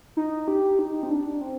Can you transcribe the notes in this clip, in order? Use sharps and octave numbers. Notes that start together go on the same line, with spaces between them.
D#4
G4
D#4
C4
D4
C4